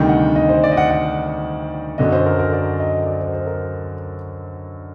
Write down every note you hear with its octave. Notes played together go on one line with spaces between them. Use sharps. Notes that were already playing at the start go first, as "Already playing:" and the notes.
Already playing: D2 C3 D#3 G3 G5
F#5
D#5
C5
D5
D#5
F#5
F#5
F#2 D3 F#3 D#5
C5
A#4
A#4
D5
D#5
D5
C5
C5
A#4